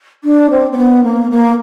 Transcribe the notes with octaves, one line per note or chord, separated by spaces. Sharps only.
D4
C4
C4
B3
A#3
A#3